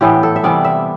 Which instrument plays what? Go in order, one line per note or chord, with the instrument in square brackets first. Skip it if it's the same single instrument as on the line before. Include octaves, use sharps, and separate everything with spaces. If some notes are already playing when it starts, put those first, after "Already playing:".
[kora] A2 E3 B3 G4
A4
E5
C3 E3 G3 B3 D5
E5